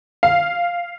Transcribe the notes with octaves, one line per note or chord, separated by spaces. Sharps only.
F5